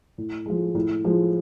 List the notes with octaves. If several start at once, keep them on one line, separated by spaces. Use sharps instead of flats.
A2
F3 G#3
A2
F3 G#3